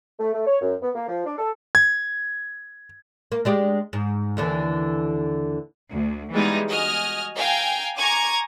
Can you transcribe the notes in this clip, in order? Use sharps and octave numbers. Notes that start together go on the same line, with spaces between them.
A3
A3
C#5
F#2
B3
A#3
F3
D4
A4
G#6
A#3
G#3 D4 G4
G#2
D#2 D3 E3
D2
E3 G3 G#3 B3 D#4
F#4 D#5 G#5 F6
F5 G5 G#5 A#5
G#5 A#5 C#6 D6 G#6